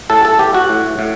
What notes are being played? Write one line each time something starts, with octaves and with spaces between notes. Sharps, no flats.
A2 A4
A4
E3 G4
F#4
A2
A2